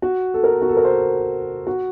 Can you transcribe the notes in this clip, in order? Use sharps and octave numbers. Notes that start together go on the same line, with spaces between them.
F#4
A4
A#4
F#4
A4
A#4
C5
F#4